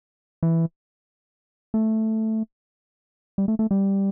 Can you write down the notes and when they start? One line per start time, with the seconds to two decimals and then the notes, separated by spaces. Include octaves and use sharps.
0.43 E3
1.74 A3
3.38 G3
3.48 A3
3.59 A3
3.71 G3